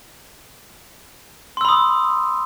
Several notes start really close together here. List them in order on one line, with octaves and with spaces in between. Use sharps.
C6 E6 B5 D#6